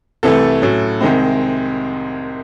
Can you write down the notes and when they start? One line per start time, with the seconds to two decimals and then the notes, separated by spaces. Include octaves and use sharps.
0.23 C2 C3 E3 A3 A4
0.62 A2 F#3 C#4
1.01 C2 C3 D#3 G#3 C4